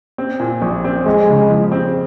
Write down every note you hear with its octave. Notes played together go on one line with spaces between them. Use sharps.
C4
A#2
A#1
C4
F2 G#3
C#3
F3
C4